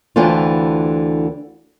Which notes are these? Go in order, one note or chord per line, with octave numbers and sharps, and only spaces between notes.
D2 D3 E3 C4 F4